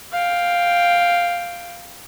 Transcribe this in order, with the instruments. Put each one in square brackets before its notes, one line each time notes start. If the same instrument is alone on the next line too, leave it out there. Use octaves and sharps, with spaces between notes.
[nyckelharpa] F5 G5